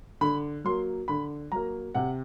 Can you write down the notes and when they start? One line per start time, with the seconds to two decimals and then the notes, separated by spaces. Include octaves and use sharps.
0.21 D3 B5
0.64 F#3 A#3 C6
1.08 D3 B5
1.52 F#3 A#3 A#5
1.95 C3 F#5